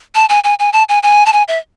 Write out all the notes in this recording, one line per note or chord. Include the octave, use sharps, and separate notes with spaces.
A5
G#5
G#5
G#5
A5
G#5
G#5
A5
G#5
E5